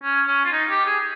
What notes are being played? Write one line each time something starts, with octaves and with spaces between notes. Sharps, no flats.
C#4
C#4
F4
D#4
G4
G#4